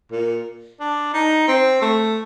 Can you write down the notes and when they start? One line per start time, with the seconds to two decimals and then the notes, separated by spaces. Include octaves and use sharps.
0.12 A#2
0.80 D4
1.14 D#4
1.48 C4
1.82 A3